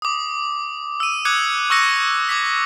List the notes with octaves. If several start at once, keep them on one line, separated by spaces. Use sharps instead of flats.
D6 D#6
E6 D#7
D6 D#6 F#6 G#6 C#7
C#6 E6 F#6 A#6 C#7
D6 G#6 B6